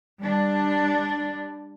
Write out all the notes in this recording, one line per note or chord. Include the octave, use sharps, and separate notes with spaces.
G3 D4